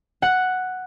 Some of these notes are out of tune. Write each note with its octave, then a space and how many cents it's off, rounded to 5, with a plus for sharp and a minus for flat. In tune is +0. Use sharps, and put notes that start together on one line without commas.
F#5 +0